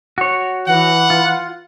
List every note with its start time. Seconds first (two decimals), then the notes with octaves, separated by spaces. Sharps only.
0.18 F#4 C#5
0.67 E3 F#5
1.10 F4